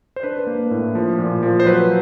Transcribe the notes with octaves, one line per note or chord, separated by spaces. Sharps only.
C5
D4 B4
A#3
A2
F3
A#2
F3
C5
F#3 B4